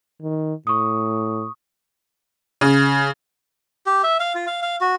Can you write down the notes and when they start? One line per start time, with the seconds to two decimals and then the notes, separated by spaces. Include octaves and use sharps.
0.22 D#3
0.67 A2 C#6 D#6
2.61 C#3
3.86 G4
4.04 E5
4.20 F5
4.35 F4
4.47 F5
4.62 F5
4.81 F#4